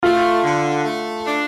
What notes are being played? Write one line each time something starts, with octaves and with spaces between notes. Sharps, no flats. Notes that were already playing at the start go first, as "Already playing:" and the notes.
A3 F4
D3
A3
D4